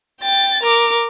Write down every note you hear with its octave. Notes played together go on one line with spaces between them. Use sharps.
G5 A6
A#4 D6